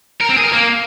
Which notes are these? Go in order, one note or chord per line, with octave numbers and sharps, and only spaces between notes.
A#4
C4
G#4
A#4
A#3